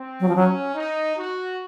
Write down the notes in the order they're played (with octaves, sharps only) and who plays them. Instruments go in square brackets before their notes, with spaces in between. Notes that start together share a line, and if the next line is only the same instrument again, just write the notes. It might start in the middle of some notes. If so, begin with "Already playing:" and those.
Already playing: [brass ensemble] C4
[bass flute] F#3
F3
[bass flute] F#3 [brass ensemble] C#4
[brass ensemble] D#4
F#4